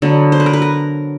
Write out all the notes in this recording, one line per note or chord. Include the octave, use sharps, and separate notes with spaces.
D3 F#3 B3
C5
B4
A#4
B4
A#4